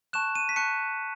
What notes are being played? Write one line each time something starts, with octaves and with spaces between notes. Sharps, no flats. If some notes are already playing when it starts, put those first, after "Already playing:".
A5 C#6 F#6 E7
D#7
B6
A5 C#6 F#6 C#7